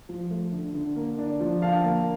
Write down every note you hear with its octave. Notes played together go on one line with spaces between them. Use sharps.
F3
A3
D3
D3
A#3
D4
F3
D3 F5 A5
A#3